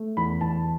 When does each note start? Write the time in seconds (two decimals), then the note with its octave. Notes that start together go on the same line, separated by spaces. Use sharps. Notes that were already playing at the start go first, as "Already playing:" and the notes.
Already playing: A3
0.17 E2 B5
0.41 E2 A5